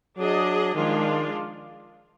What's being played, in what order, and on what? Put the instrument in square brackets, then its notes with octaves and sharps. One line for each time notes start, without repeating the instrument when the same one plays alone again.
[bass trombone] F#3 [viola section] D4 G#4 D#5
[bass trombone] D#3 [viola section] F3 G#3 D4 F4